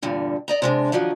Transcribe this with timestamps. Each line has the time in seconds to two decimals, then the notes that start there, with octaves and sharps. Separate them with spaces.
0.02 E2 G2 A#2 D3
0.48 D5 D#5 A#5
0.62 C3 G#3 D4
0.92 D#3 F3 F#3 D4 D#4